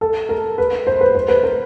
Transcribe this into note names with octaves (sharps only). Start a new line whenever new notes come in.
A4
A#4
B4
C5
B4
C5
B4
A#4